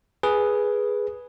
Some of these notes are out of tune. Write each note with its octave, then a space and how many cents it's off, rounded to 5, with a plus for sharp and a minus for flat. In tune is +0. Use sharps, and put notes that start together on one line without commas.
G#4 +0 B4 -5 G#5 +0